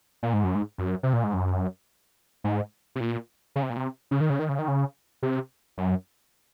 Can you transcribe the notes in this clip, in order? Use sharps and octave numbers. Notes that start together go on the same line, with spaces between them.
A#2
G#2
F#2
G#2
F#2
C3
A#2
G#2
F#2
G#2
C3
A#2
C#3
C3
A#2
C3
C#3
D#3
C#3
D#3
C#3
D#3
C#3
C3
F#2